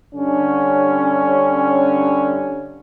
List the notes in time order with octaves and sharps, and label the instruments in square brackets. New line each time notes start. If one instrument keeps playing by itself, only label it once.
[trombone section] G2 D3 C#4